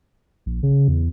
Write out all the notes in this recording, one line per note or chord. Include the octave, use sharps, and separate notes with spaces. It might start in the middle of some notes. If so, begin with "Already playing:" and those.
A#1
C#3
E2